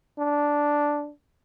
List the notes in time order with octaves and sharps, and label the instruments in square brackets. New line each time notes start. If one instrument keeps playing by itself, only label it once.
[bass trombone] D4